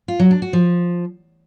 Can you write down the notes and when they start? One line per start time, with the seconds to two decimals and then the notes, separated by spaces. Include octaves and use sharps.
0.08 F4
0.19 F#3
0.31 D4
0.42 F#4
0.53 F3